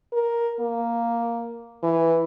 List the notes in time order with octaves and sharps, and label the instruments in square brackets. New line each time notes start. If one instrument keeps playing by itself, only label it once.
[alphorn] A#4
A#3
E3